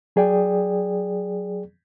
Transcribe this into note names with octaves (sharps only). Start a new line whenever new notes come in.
F#3 G#4 D5 G5